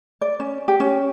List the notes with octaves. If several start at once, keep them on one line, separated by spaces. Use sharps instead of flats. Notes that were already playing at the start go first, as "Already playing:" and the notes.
D5
C#4
G4
C#4